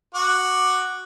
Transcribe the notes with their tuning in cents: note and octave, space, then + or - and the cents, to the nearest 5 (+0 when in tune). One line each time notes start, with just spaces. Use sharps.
F#4 +0 D6 +15